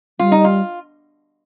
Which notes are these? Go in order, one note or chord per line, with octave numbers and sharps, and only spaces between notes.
G3 F4
D#4
F4